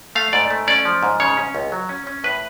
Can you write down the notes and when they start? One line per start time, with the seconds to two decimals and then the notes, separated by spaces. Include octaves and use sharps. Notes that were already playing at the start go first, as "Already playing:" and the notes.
0.15 A3 F5
0.33 G#2 D5
0.50 A3
0.67 C#4 D5
0.85 F3
1.03 G#2
1.20 C#3 C#5
1.37 C#4
1.55 C#2
1.72 F#3
1.89 C#4
2.07 C#4
2.24 A2 B4